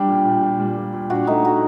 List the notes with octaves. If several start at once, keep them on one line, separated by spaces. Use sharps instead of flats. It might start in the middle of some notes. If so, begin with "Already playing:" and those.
Already playing: G3 D4 G4
A#2
A#2
A#2
G3
A#2
A#2
D4 F#4
A3 D#4
F#4